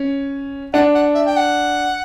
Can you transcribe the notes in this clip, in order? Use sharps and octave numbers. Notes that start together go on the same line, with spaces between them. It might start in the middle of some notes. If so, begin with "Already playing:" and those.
Already playing: C#4
D4 F#5
F#5
E5
G5
F#5